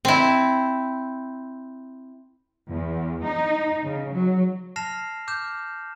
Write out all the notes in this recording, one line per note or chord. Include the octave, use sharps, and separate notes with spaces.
C4 E4
E2
D#4
C#3
F#3
A5 F6 A#6 C7 E7 F7
D6 F6 G6 E7